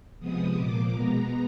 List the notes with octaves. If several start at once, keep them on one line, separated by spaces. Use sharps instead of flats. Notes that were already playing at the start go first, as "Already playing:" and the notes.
C3 F3 G#3 B3 D#6
A#2 F3 A#3 D6
B2 G#3 B3 A#5